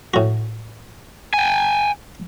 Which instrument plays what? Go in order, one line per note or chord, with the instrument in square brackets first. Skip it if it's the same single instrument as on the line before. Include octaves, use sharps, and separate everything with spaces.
[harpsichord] A2 F#4
[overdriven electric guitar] G5 G#5